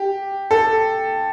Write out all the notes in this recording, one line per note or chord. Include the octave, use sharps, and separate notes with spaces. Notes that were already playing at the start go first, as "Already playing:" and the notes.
Already playing: G4
A4